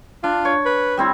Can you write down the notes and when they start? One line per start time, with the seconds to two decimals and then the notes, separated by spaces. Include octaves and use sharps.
0.24 D4 F4
0.45 C#5
0.66 B4
0.97 G3 C4 E4